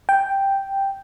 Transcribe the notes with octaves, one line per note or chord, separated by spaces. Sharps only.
G5